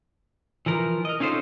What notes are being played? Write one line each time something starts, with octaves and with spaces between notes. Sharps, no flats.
E3 F3 A#4
A#4 D#5
C#4 D#4 F4 A4 C5